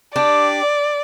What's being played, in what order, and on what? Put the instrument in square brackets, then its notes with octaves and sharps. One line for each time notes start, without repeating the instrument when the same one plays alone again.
[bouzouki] D4 G4 [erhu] D5